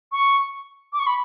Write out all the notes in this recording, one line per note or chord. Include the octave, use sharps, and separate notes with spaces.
C#6
D6
C#6
B5